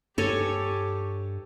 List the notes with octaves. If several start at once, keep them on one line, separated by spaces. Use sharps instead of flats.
G2 G4 A4 C#5 G#5